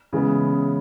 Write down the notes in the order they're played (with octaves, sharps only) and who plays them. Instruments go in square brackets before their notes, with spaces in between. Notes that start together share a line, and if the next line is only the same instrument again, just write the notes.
[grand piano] C#3 E3 G#3 B3